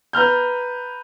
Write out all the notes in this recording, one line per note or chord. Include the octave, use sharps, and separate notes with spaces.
B4 A#5 F6 G6